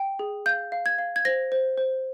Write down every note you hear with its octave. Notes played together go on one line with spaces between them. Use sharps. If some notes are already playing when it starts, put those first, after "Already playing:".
Already playing: G5
G#4
F5 G6
F5
G#6
F5
G#6
C5 A#6
C5
C5